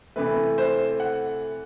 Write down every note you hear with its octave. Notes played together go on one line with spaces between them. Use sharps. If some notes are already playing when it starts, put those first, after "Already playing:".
C3 E3 A3 B4
C5
F#5